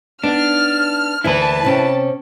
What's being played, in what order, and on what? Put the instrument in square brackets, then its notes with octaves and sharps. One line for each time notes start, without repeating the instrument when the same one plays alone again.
[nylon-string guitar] B3 D#4 [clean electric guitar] D4 [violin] F6
[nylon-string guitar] D2 E3 A#3 [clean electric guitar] E4 B4 [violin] A5
[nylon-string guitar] C3 C#4 G5